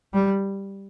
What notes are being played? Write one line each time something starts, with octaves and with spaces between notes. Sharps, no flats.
G3